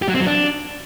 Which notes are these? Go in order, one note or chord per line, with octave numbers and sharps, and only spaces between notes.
G4
F#3
C4
F#3
D4